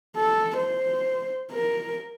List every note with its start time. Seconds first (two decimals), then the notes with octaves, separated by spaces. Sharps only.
0.16 A4
0.58 C5
1.52 A#4